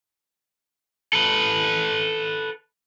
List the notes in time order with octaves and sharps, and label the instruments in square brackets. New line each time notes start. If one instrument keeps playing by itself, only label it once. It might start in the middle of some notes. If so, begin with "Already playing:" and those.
[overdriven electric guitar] A4 B4